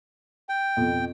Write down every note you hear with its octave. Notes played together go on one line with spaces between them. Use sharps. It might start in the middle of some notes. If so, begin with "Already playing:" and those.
G5
F2 B2